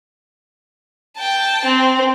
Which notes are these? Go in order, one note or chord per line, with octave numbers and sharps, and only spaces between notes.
G5 A5
C4